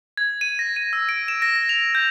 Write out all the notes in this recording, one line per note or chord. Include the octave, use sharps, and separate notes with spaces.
G#6
D#7
A#6
D#7
E6
D7
E7
A#6
A#6
F7
G6